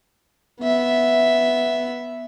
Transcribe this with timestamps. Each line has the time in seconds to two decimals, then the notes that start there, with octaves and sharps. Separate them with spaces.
0.60 B3 E5